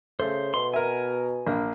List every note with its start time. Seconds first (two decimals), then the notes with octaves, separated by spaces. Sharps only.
0.20 C#3 A3 C5
0.54 B2 C6
0.74 A#4 E5 G#5
1.47 A#1 A#3